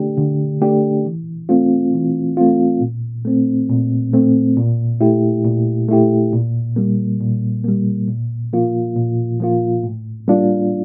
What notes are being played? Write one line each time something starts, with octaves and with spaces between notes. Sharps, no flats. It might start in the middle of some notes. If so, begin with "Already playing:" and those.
Already playing: D3 A3 D4 G4
D3
A3 D4 G4
E3
A3 C4 F4
E3
A3 C4 F4
A#2
A3 C4
A#2
A3 C4
A#2
A3 E4 G4
A#2
A3 E4 G4
A#2
G3 A#3
A#2
G3 A#3
A#2
F3 A#3 F4
A#2
F3 A#3 F4
A2
G3 A#3 D4 F4